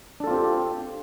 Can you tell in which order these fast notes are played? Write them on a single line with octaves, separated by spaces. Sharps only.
D4 A4 F4 C4 G4